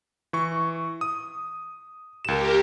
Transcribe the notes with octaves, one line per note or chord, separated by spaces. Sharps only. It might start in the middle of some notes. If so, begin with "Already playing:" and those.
E3 C#6
D#6
C#2 G4 A#4 E7